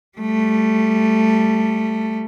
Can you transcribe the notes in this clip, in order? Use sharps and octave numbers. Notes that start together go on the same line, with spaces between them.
G3 A3